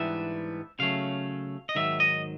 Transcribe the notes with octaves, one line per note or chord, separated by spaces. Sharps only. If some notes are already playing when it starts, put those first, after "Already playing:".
Already playing: G#2 E3 G3 B3 D4 E5
C#3 F#3 A3 C#4 F5
D#5
G#2 D#3 F#3 E5
D#5